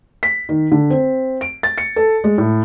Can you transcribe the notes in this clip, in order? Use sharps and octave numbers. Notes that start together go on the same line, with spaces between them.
B6
D#3
D3
C4
D7
A6
C#7
A4
G#3
A2